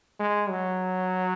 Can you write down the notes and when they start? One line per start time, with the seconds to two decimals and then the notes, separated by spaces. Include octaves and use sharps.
0.19 G#3
0.50 F#3